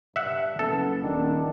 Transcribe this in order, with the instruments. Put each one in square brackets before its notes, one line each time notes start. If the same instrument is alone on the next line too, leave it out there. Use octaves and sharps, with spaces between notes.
[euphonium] G2 [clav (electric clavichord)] E5 F#5
[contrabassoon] F#1 [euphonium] B3 [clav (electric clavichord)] A4
[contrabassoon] D#1 [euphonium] D#3 [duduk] D4